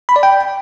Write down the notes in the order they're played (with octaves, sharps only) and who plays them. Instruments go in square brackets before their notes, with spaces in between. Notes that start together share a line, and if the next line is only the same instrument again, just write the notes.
[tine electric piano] B5
D5
G5